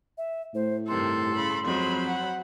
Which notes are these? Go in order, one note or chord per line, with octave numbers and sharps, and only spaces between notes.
E5
A2 C5
G2 C3 D#3 A4 C6
C#3 B5
F2 F#3 G#3 C5 B5
F#5